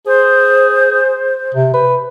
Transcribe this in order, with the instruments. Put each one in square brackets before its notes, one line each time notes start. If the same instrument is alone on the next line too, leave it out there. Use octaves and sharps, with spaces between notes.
[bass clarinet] G#4 [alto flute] C5
[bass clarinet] C3
B4